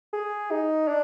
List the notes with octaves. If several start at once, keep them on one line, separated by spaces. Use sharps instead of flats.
G#4
D#4
D4